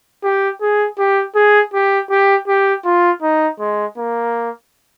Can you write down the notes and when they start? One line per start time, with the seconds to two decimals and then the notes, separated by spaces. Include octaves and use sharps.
0.24 G4
0.61 G#4
0.99 G4
1.35 G#4
1.74 G4
2.10 G4
2.48 G4
2.85 F4
3.22 D#4
3.60 G#3
3.98 A#3